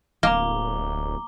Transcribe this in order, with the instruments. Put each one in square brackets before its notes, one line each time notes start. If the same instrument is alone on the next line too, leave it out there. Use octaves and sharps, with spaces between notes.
[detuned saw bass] D1 [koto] A#3 [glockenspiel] A#5 D6 G7